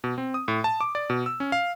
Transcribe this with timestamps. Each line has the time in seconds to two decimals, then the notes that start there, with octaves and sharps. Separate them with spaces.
0.04 B2
0.18 C4
0.34 D#6
0.48 A2
0.64 A5
0.81 D6
0.95 D5
1.10 B2
1.26 E6
1.40 C#4
1.52 F5